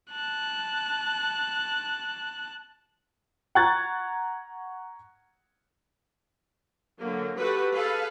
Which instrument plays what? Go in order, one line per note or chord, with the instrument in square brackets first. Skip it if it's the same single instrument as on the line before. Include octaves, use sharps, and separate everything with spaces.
[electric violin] A5 F#6
[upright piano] F#5 A#5 C#6 F#6 G#6 A6
[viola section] D3 F#3 A#3
F#4 G4 A4 B4
G#4 A4 B4 F5